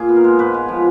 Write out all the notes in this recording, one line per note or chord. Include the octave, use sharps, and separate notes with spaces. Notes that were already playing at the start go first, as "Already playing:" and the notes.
Already playing: A#2 G#4
B3
A#4
G#3
G#2 B4
G#3
F3